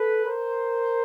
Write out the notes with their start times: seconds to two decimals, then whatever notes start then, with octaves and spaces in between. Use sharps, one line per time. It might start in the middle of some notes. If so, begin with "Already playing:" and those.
Already playing: A4 B4
0.25 A#4 C5